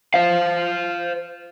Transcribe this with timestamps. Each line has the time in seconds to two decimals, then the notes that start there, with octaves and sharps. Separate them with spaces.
0.14 C5 F5